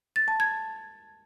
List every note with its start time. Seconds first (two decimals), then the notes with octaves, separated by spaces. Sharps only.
0.16 A6
0.28 A5
0.40 G#6